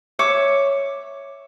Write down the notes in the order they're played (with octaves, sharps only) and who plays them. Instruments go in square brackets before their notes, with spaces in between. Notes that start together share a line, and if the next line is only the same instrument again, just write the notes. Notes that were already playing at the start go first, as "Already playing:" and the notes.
[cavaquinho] C#5 E5 D6